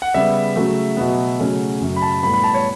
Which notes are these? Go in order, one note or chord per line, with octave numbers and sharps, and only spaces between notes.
F#5
C#3 G3 B3 E5
C#3 F#3 A3
B2 F#3 B3
C#3 F#3 A3 C#4
F#2 C#3 F#3
B5
A5
A2 G3 B3 B5
B5
A5
C#5